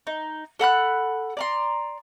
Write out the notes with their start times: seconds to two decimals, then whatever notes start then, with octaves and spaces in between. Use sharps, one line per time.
0.07 D#4
0.59 A4 F#5 B5 F#6
1.37 D5 A#5 C6